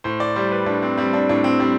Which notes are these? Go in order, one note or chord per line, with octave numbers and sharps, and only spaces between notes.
A2 C5
D5
G3 C5
B4
A2 D4
C4
G3 C4
D4
A2 D4
C4
G3 C4